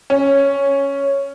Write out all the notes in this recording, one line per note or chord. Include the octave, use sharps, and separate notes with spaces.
C#4